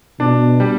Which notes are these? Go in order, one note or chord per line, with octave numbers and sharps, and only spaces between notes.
B2 D4
G3